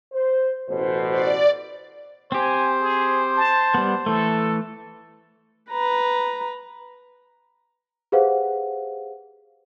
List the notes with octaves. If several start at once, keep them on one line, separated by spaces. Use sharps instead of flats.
C5
A1 B2 C5
D5
C4 G4 C5 G#5
G#4
A5
G3 B3
E3 A3 A4
B4 A#5
G4 G#4 B4 C5 F5 F#5